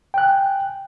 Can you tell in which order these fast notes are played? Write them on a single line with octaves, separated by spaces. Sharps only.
G5 F#6 G#5